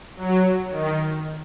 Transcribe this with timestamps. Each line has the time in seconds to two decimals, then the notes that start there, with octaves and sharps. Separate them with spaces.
0.17 F#3
0.70 D#3